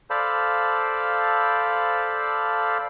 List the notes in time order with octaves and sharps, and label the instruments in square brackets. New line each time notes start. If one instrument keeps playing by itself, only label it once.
[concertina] A4 C5 D5 F5 A5 B5